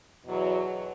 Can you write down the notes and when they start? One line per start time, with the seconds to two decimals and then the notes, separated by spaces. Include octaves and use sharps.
0.25 E2 B2 F#3